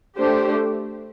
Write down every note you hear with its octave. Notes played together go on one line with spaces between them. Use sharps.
A3 D4 G4 C5